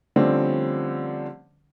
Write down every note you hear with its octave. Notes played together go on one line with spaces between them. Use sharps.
D3 F3 G3 A3 C4 C#4